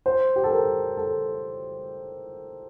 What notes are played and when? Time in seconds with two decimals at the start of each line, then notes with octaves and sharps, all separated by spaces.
0.06 C5
0.36 G4
0.44 A4
0.51 A#4
0.97 A4